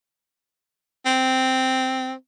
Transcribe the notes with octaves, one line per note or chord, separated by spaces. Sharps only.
C4